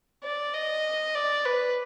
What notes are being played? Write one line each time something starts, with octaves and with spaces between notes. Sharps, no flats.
D5
D#5
D5
B4